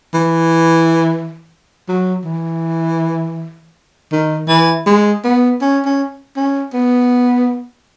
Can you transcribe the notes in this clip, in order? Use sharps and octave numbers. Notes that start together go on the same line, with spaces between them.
E3
F#3
E3
D#3
E3
G#3
B3
C#4
C#4
C#4
B3